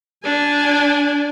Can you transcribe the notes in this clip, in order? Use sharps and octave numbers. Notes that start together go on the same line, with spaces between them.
D4 G#5